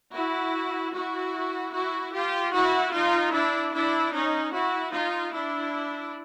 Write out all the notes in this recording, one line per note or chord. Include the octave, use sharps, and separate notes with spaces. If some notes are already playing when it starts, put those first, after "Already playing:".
E4 F#4
E4 F#4
E4 F#4
F4 G4
E4 F#4
D#4 F4
D4 E4
D4 E4
C#4 D#4
E4 F#4
D#4 F4
D4 E4